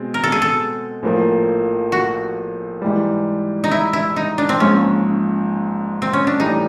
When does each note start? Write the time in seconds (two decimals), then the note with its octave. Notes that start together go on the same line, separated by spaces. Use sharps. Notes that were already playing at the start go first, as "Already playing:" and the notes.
Already playing: B2 G#3 C4
0.14 A#4
0.24 A4
0.32 G#4
0.42 A4
1.03 A#1 A2 F3 A#3
1.92 F#4
2.82 G#2 E3 G3
3.64 D#4
3.71 E4
3.93 E4
4.16 D#4
4.38 D4
4.49 C4
4.60 A#1 G#2 F3 G#3 C#4
6.02 C4
6.13 C#4
6.27 D4
6.40 A2 E3 G3 D#4